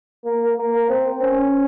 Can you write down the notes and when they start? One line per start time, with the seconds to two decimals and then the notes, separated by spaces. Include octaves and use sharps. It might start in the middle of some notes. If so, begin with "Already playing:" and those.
0.25 A#3
0.57 A#3
0.89 C4
1.22 C#4